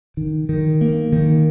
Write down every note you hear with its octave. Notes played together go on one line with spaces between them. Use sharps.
D#3
D#3
A#3
D#3